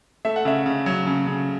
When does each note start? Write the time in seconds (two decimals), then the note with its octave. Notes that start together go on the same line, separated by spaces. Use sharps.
0.25 A3 E5
0.36 F#5
0.45 C#3 E5
0.66 C#3
0.86 F#3
1.06 C#3
1.27 C#3